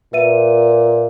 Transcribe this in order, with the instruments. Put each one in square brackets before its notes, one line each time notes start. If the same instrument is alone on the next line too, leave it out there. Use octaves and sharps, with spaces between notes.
[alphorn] A#2 [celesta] B4 E5 D#7